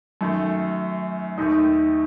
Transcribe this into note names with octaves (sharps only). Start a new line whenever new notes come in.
F#2 D#3 A3
D#2 D#3 A3 D#4